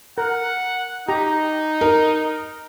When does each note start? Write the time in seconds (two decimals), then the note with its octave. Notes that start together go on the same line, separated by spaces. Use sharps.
0.18 A#4 F#5
1.09 D#4 G4 A#5
1.81 A#4